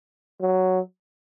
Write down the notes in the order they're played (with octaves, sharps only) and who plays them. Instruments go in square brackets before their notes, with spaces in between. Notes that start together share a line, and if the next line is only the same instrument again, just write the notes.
[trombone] F#3